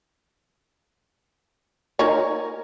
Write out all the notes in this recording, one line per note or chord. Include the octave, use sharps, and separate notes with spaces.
D#4 A#4 C#5